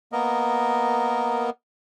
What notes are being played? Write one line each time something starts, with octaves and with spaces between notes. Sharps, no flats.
A#3 B3 A#4 D#5